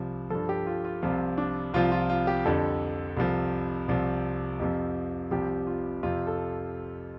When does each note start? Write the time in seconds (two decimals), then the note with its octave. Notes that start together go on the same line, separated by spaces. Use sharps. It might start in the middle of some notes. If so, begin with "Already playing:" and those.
Already playing: C2 C3 F3
0.30 G2 F3 A4
0.49 G4
0.67 F4
0.85 F4
1.02 C2 C3 F3 F4
1.37 D4
1.74 C2 C3 F3 F4
1.92 F4
2.09 F4
2.27 G4
2.45 F2 D3 G3 A4
3.17 C2 C3 F3
3.88 C2 C3 F3
4.60 F2 C3 F3
5.31 C2 C3 F3 G4
5.67 F4
6.03 F2 C3 F3 F4
6.27 A4